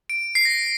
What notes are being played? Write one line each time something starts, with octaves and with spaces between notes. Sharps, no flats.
D7
C7
A#6